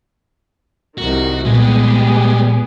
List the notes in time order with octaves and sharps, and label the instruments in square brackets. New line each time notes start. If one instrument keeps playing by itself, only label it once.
[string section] C2 D#3 [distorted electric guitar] F#4
[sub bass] A#2 [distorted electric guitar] G3 G#3 [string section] B3 G4 G#4